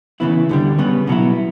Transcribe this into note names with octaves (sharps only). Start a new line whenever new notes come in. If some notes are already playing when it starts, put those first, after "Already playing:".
C#3 E3 B3 E4
D2 D3 G3
C#3 G3 B3
B2 F#3 B3 E4